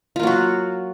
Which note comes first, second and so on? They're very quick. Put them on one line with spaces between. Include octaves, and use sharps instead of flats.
F4 A#3 F#3 F#4